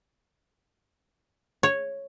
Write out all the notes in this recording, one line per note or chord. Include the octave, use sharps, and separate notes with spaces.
C#5